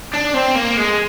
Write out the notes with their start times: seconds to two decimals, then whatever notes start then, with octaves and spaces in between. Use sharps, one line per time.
0.13 D4
0.34 C4
0.56 A#3
0.77 G#3